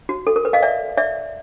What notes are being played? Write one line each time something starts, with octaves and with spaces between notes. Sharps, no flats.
F#4
A4
A#4
B4
D#5 F5
D5 E5
D5 E5